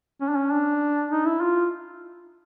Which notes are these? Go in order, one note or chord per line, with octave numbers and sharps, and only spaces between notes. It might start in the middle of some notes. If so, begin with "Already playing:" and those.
C#4
D4
C#4
D4
D#4
E4
F4